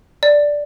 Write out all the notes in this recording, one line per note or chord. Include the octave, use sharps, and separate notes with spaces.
D5